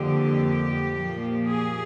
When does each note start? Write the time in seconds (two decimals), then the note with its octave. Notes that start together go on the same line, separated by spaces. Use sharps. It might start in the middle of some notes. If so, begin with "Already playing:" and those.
Already playing: F2 D3 F3 A#3 G4
0.92 A#2 F3 A#3
1.46 G#4